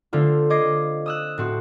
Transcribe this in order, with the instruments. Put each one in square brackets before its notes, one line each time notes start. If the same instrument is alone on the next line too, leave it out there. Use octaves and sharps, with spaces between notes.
[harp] D3 A3 C4 F4
D#5 D6 G#6 C7
D#6 E6 F#6
A2 C4 F#4